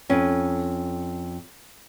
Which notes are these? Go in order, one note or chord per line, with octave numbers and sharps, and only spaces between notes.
F2 C#4